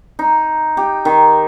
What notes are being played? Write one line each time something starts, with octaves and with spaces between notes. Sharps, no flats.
D#4
G4
D#3